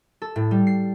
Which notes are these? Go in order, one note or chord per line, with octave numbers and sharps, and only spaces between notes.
A4
A2
G3
C7